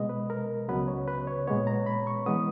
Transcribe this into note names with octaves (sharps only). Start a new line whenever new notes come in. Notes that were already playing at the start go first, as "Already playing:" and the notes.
Already playing: B2 G#3 B3 D#5
B4
A#4
C#2 C#3 F#3 B3 B4
C#5
B4
C#5
A#2 G#3 B3 C#5
A#5
B5
C#6
E3 G#3 B3 D#6